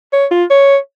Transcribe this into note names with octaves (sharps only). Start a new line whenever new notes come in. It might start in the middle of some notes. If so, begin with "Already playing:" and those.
C#5
F4
C#5